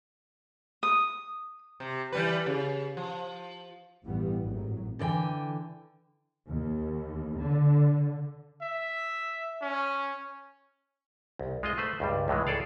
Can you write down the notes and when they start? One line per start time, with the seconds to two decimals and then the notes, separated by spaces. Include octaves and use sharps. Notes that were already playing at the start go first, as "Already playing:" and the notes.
0.83 D#6
1.80 C3
2.12 E3 G3 B4
2.46 C#3
2.97 F3
4.05 A1 G2 E3 G3 B3
4.42 G#1 A2 F#3
4.99 D3 E3 D5 G5 G#5
6.48 D#2
7.38 D3
8.62 E5
9.62 C#4
11.39 C2
11.63 G#3 F4 D#5
11.78 A3 B4 C5
12.00 C#2 G2 G3
12.28 C#2 A2 E3 G#3
12.47 G#4 A4 D5 F5